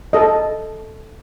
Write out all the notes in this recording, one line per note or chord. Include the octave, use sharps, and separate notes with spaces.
A4 D#5